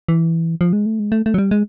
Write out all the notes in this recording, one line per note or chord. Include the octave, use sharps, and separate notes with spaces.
E3
F3
G#3
A3
G#3
A3
A3
F#3
G3
G#3